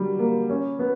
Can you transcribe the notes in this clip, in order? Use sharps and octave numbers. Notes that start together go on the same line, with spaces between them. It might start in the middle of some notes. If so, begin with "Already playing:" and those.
Already playing: D3 F#3 G3
A#3
C#4
B3